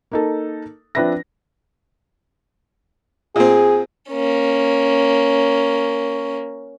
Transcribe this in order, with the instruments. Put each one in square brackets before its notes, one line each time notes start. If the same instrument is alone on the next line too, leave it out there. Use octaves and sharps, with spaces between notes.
[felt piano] A#3 D#4 A4
F3 C4 D4 B4 E5 A#6
[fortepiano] A#2 C4 [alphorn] G#4
[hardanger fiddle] A#3 C#4